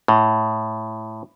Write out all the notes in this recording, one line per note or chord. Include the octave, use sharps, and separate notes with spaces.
A2